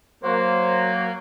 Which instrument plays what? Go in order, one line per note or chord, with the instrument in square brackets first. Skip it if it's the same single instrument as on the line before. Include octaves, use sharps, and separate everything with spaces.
[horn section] F#3 A#3 F#4 [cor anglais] C5